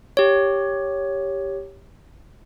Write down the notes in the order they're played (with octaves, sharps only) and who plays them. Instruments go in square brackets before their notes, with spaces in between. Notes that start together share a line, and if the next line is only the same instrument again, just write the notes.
[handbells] G4 C#5